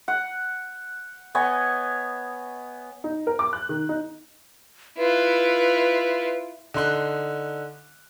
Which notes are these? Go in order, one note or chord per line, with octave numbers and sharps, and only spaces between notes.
F#5
B3 C#5 D#5 G#5
D#4
A#4
D6
F#6
D#3
D#4
E4 F4 B4
D3 D#4 C6 F#6